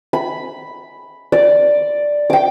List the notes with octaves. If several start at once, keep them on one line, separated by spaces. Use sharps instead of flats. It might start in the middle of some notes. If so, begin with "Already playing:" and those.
B5
D5
G5 D6